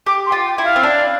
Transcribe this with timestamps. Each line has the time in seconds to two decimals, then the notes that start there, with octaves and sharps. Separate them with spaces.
0.06 G4 D6
0.26 C6
0.32 F4
0.44 G5
0.58 E4
0.64 F5
0.76 C4
0.83 D4